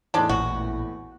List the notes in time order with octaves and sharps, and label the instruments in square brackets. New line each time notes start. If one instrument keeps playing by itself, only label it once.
[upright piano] E2 A2 [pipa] G#3 D4
[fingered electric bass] A1 A#2 [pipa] F#4